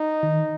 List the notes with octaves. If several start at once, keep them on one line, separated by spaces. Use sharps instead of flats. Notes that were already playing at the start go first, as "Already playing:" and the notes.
Already playing: D#4
D#3